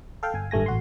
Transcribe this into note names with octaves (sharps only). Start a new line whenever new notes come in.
A4 F5 G5
G1 G#5
G#1 G2 A3 G#5 A#6
A1 F#4 C6